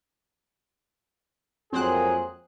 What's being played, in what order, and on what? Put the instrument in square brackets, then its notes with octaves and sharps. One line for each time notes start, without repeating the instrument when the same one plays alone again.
[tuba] F2 [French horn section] F#3 G#3 A#3 [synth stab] C4 C5 F#6 [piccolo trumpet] G#4